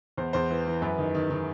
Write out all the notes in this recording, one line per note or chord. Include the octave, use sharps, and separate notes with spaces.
E2 C5
E2 C5
E3
E3
F#2 B4
D#3
D#3
D#3